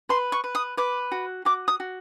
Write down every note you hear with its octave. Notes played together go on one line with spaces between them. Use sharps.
B4 C6
C#6
B4
D#6
B4 D6
F#4
F#4 D6
D#6
F#4